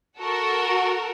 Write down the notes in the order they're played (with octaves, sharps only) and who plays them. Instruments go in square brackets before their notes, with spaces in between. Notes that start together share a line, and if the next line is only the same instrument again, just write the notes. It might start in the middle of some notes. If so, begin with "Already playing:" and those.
[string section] F#4 A4 A#4 F#5